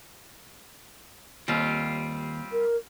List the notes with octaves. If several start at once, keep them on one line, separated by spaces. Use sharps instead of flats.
D#2 G3 C4 F4
A#4